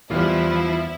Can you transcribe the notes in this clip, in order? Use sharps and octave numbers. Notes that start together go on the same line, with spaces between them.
E2 E3 G3 E4 F4 C5 F5